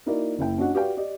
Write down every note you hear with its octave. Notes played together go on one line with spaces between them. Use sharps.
A#3 D#4 E4 F#4 A#4 D5
F#1 E4 G5
C#4 D4 F#4 D#5 F#5
F#4 G4 B4 D5 F5 G5
G4 D5 D#5